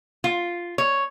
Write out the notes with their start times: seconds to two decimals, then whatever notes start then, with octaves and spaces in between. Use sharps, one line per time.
0.24 F4
0.78 C#5